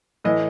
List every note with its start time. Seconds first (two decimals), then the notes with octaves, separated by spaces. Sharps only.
0.24 A2 E3 D#5